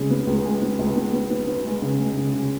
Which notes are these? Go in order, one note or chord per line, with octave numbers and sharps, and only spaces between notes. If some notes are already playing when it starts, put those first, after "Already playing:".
Already playing: C#3 G#3
B3
C#2
G#3
B3
C#2
B3
B3
B3
B3
G#3
C#3
G#3
C#3
C#3